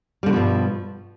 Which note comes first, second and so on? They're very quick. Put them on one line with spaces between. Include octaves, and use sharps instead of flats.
G3 D3 B2 F3 G2